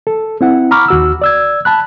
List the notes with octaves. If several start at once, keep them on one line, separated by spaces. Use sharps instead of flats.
A4
C4 E4 F#5
A#5 B5 C#6 D6 F6
D#2 F#4 E6
D5 E6 G#6
A5 B5 F#6